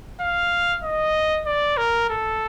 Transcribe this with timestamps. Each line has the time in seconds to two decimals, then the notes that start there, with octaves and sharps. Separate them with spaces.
0.21 F5
0.84 D#5
1.46 D5
1.77 A#4
2.09 A4